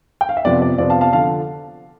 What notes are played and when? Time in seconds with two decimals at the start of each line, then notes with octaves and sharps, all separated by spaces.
0.21 G5
0.29 F5
0.37 E5
0.45 F2 C3 F3 B3 D5
0.62 D5
0.78 F2 C3 F3 B3 D5
0.90 F5 A5
1.01 F5 A5
1.13 D3 F3 F5 A5